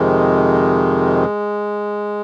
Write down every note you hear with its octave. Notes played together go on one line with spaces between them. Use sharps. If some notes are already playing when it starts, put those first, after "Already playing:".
Already playing: F2 C3 D#3 G#3